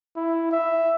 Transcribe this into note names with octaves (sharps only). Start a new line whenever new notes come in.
E4
E5